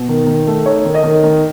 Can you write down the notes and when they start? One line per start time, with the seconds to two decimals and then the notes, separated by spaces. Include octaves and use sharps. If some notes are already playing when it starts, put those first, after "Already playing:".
Already playing: B2
0.09 D#3
0.27 D#3
0.47 A3
0.66 D#4 C#5
0.85 D#3
0.94 D#5
1.03 D#3
1.23 D#3